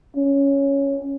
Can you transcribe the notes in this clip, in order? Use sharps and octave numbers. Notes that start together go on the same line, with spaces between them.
C#4